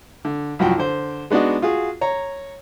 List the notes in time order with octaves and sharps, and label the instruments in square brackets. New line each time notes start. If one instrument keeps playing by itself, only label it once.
[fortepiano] D3
C2 F#2 F3 F#4 G5
D3 C5
G#3 B3 D4 D#4 F#4
F4 F#4 G#4
C#5 A#5